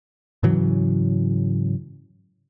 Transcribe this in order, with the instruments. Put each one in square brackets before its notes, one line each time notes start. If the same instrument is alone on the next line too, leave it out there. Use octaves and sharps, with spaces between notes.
[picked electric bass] G#2 C#3 E3 F#3